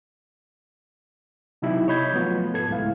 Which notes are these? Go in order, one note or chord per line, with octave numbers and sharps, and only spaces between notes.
C3 F#3 B3 D#4 E4 G4
C#5 D#5 B5 G6 G#6
F3 F#3 A3 B3 F4
G#2 A4 B4 G#6
C#2 A2 G#3 E4 F5